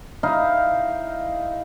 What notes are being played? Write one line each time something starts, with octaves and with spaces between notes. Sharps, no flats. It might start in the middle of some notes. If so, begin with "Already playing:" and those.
D#4 E4 F5